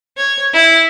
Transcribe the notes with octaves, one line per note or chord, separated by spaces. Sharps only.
C#5
E4